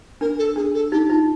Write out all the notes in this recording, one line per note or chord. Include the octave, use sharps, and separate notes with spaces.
D4 A#4
A4
D4 G#4
A4
D#4 G4
D#4 F4